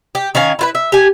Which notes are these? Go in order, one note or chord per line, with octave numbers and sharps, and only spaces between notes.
G4
D#3 C#4 F5 G#5
E4 F4 B4
E5
G4 G#5